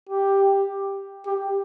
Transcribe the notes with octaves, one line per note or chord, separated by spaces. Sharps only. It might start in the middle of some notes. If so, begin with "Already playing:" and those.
G4
G4